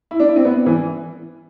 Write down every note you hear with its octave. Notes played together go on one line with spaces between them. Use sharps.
E4
D4
E4
C4
B3
E3